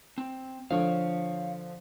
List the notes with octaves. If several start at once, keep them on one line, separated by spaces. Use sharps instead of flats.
C4
D3 F3 C#5 F5